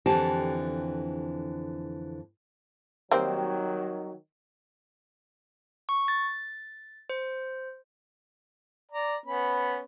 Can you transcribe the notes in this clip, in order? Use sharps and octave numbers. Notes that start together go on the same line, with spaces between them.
F2 D3 E3 G4 A5
D#3 F#3 G3 A#3 C4
C#6
A6
C5
D5 A#5
B3 C#4 B5